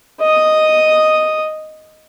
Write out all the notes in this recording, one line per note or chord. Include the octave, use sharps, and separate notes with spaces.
D#5 D#6